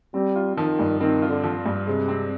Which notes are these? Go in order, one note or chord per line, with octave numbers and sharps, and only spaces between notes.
G3 C4
F4
D#3 F3
G2
D#3 C4
F4
D3
F3
G2
C3 G#3
C4